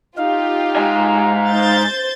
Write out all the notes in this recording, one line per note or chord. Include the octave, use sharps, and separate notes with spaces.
D#4 F4 G4 F5
G#2 G#5
C5 G6 A6